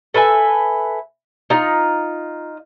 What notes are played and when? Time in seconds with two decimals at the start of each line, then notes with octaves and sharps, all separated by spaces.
0.14 A4 B4 E5 G#5
1.50 D#4 F4